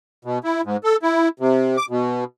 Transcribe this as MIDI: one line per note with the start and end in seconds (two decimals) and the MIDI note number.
0.25 0.39 47
0.44 0.61 64
0.65 0.77 44
0.84 0.97 69
1.02 1.28 64
1.40 1.77 48
1.77 1.86 86
1.90 2.24 47